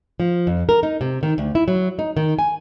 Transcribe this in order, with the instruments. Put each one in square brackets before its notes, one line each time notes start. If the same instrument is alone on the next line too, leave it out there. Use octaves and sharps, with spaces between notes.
[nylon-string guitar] F3
F2
A#4
D#4
C3
D#3
D2
E4
F#3
D#4
D#3
G#5